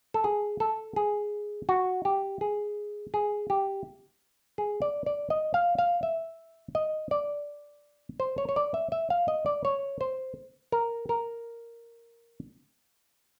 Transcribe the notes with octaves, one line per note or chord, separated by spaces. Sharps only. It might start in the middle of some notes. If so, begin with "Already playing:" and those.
A4
G#4
A4
G#4
F#4
G4
G#4
G#4
G4
G#4
D5
D5
D#5
F5
F5
E5
D#5
D5
C5
C#5
C#5
D5
E5
E5
F5
D#5
D5
C#5
C5
A#4
A#4